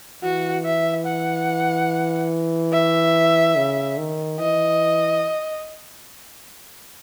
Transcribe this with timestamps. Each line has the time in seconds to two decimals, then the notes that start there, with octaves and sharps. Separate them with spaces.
0.23 E3 F#4
0.65 E5
1.06 F#5
2.72 E5
3.56 C#3
3.97 D#3
4.39 E3 D#5